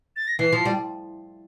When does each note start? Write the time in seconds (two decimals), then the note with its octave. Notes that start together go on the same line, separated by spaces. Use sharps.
0.16 A6
0.27 A#6
0.39 E3 C7
0.52 F3
0.65 G3